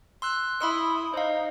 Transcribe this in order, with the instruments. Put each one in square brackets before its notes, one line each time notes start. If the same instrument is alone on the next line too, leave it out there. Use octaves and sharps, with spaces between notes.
[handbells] C6 E6 F#6
[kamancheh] E4 D#6 [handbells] B5 C6 E6
[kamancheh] D#4 [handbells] C5 F5